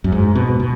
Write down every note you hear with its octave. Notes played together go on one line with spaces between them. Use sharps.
F#2
G#2
B2
B2